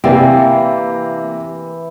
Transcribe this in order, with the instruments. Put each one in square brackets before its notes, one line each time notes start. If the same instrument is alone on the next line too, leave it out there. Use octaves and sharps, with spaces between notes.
[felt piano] C3 [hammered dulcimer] E3 [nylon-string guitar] A#3 F5 [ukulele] E4 D5 G5